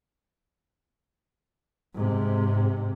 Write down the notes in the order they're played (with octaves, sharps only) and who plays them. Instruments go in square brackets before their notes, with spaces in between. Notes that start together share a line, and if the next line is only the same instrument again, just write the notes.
[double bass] G#2 C3